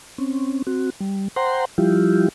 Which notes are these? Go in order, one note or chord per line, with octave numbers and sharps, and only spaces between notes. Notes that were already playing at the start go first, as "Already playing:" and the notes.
C4 C#4
C4 F#4
G3
C5 F#5 G5 A#5 C6
F3 G3 E4 F4 G4